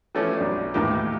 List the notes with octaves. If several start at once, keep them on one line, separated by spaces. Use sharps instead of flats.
E3 F3 A3 C#4 G4
B1 D4
D#2 A2 E3 A#3 G4